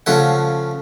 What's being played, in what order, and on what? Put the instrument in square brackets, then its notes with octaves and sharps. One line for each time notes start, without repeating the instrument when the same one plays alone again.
[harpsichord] C#3 F3 A3 F#5